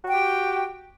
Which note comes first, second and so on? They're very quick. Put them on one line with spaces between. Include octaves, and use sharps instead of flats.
F#4 G5 G4